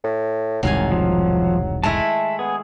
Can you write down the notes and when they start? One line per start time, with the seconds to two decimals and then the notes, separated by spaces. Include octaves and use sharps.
0.04 A2
0.63 E1 C2 G#2 D#3 F#3 F5 G#5
0.92 F3
1.84 G#3 A3 E4 E5 A5
2.39 B3 G#4